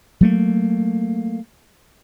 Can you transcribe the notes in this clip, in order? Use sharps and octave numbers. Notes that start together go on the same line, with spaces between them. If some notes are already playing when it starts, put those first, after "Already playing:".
F#3 A3 A#3